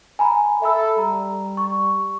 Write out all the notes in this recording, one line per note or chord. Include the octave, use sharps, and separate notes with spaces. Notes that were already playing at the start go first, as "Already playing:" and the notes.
G#5 A#5 B5
A4 E5 B5 E6
G3 A#5
C#6